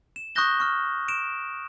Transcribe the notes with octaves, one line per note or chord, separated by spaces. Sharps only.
E7
C#6 D#6 F#6 G6 A#6 G7
C#6 F6
D7 E7